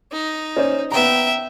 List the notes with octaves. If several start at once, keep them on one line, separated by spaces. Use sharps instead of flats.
D#4
C#4 C5 D5
B3 E5 G5 A#5